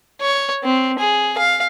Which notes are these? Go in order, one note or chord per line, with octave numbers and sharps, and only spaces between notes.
C#5
C4
G#4
F5